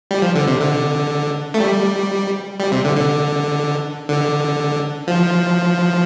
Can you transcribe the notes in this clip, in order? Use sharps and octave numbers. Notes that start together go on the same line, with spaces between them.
G3
F3
D3
C3
D3
A3
G3
G3
C3
D3
D3
D3
F3